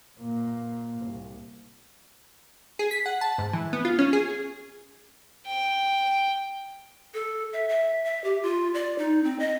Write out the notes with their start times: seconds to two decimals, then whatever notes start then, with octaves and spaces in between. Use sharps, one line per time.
0.19 A#2 A#3
1.04 C2
2.79 G#4
2.91 B6
3.06 F#5
3.21 A5
3.38 G#2
3.53 E3
3.73 B3
3.85 F4
3.99 C#4
4.13 G#4
5.47 G5
7.14 A4
7.53 E5
7.69 E5
8.05 E5
8.24 G4
8.43 F4
8.74 D5
8.98 D#4
9.24 C4
9.40 D#5